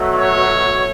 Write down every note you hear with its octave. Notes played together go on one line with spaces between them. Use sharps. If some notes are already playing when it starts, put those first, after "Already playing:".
Already playing: B2 F#3 A3
C#5